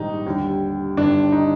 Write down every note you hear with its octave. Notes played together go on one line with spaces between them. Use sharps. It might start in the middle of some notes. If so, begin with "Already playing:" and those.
Already playing: A#1 G#2 D#3 G3 D#4
D#2 D3 G3
G1 G2 D#3 D4
D#4